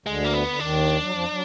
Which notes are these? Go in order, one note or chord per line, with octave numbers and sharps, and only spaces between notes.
D2 D3 G#3
A#3
B3
D3
D#2 D#3 D4
F#3
F2 F3
F#3